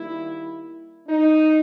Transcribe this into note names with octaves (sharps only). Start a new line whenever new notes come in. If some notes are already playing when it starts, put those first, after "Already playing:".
Already playing: D#3 G3 A#3 E4
D#4